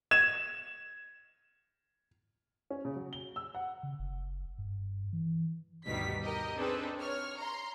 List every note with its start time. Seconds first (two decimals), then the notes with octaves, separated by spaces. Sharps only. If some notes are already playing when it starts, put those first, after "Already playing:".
0.11 G#6 E7
2.70 C#4
2.85 C#3
2.96 F#3
3.13 G7
3.36 E6
3.55 F#5
3.83 C#3
3.99 F#1
4.58 G2
5.13 E3
5.87 D2 G2 B2 D#3 G3 B6
6.22 G4 A#4 D#5
6.57 C4 D4 D#4 G#4 A4 B4
7.00 C#5 F6
7.38 A#5 C6